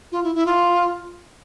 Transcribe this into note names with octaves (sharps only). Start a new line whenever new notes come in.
F4
E4
E4
F4